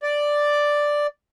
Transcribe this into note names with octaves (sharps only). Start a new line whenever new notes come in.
D5